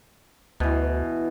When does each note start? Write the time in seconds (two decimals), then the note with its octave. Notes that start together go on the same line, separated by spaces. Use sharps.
0.60 D2 B2 E3